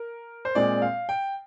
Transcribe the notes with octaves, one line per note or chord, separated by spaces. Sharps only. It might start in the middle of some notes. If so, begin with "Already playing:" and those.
Already playing: A#4
C5
A#2 G#3 C4 D5
F5
G5